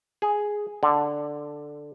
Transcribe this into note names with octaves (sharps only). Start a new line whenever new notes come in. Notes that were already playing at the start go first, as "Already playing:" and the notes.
G#4
D3